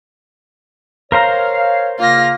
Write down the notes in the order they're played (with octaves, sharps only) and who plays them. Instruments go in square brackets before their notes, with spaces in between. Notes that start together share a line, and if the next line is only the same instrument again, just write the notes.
[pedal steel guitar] A#4 C5 A#5 [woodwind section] C#5 F5
[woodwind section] C#3 A#3 [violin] F4 A#6